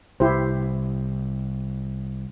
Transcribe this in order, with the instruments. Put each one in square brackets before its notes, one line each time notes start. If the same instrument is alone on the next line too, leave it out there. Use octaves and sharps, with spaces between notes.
[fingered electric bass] C2 [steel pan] E4 G4 C5